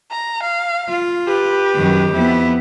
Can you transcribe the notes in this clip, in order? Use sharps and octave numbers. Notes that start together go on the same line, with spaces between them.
A#5
F5
F4
G4 B4
F#2 D#3
F2 B3 E4